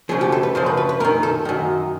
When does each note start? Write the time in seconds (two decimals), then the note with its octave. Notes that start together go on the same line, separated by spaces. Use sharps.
0.09 F#2 C#3 F3 G#4
0.21 G4
0.32 A4
0.43 B4
0.55 F#2 C#3 F3 C5
0.66 B4
0.77 B4
0.89 B4
1.00 F#2 A#4
1.05 D#3
1.23 A4
1.45 F#2 D#3